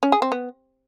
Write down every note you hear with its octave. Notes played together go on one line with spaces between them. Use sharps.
C#4
G#4
C4
B3